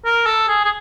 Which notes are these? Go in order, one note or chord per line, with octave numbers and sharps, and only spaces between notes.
A#4
A4
G#4
G#4